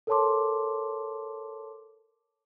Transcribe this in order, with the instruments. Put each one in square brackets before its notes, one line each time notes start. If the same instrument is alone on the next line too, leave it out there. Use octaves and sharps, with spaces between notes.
[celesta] A4 A#4 C#5 A5 C6 D6